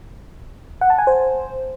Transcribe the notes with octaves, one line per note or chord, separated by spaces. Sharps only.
F#5
A5
G#5
C5